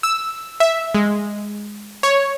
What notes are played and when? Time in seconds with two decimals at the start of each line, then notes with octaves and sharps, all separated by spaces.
0.03 E6
0.60 E5
0.94 G#3
2.03 C#5